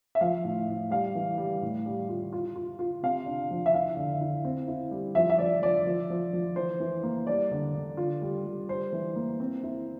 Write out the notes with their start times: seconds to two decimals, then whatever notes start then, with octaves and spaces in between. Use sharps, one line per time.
0.15 E5
0.21 F3 F5
0.45 A2
0.68 A2
0.91 G3 F5
1.15 E3
1.38 G3
1.62 A2
1.86 G3
2.09 F4
2.33 F4
2.56 F4
2.79 F4
3.03 C3 F5
3.26 D4
3.51 F3
3.66 E5
3.74 E4 F5
3.97 D3
4.21 E4
4.45 C4
4.68 E4
4.91 G3
5.15 F3 E5
5.30 E5
5.38 F3 D5
5.62 F3 D5
5.87 F3
6.10 F3
6.33 F3
6.56 E3 C5
6.80 E3
7.03 A#3
7.27 G3 D5
7.51 D3
7.75 D3
7.97 F4
8.22 G3
8.45 G3
8.69 G3 C5
8.93 E3
9.16 A#3
9.40 C4
9.63 E4